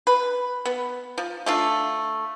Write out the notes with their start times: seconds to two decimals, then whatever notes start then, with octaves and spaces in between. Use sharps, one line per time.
0.07 B4
0.65 B3
1.18 F3
1.46 A3 D4 F4